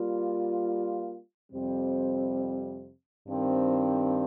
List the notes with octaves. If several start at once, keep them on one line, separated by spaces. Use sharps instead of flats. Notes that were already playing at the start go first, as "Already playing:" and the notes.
Already playing: G3 A#3 F4
F2 C3 G3 C4
G2 D#3 C4